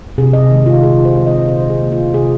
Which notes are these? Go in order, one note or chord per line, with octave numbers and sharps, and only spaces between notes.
C3 G#4
D#5
D#3 G#3
F4
A#2 G#4
C5
F3 C4 C5
D#5
A#2 C5
G#4
A#3
F4
C3 G#4